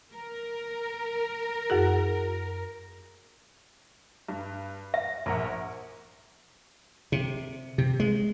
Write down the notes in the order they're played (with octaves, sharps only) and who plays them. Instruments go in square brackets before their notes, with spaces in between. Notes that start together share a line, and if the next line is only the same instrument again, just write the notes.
[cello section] A#4
[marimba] F#2 F#4 G#4
[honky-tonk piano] G2
[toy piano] E5 [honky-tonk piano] A#6
[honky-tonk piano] A#1 A#4 F#5
[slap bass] C3
C3
G#3